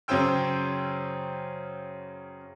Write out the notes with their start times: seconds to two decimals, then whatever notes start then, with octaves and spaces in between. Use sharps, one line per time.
0.08 F#2 C#3 C#4 C5 G5 E6